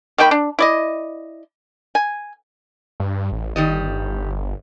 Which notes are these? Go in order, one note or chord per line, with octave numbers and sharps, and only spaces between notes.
D#3 A#3 G5 B5
D4
E4 D5 D#5
G#5
G2
A1
G1 D#3 G3 D#5